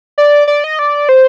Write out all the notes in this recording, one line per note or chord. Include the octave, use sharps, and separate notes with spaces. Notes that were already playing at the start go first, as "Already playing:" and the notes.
D5
D5
D#5
D5
C5